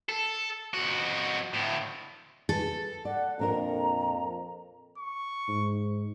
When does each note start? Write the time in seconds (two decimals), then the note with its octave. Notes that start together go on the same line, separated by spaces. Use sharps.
0.09 A4
0.74 F2 F#4
1.53 D2 A2
2.49 G#4 A4 B4
3.05 D5 F#5
3.39 F2 A#2 D4 A#4 A#5
4.98 C#6
5.48 G#2